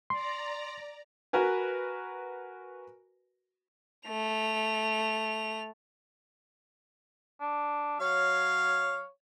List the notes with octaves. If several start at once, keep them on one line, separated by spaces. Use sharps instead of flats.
D5 A#5 C6
F#4 A#4 B4 G#5
A3 F7
D4
F#3 C#5 F5